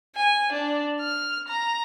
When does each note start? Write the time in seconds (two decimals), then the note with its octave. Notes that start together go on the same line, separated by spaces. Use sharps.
0.16 G#5
0.53 D4
1.01 F6
1.48 A#5